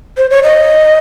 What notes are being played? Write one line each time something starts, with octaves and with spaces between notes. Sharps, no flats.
C5
C#5
D#5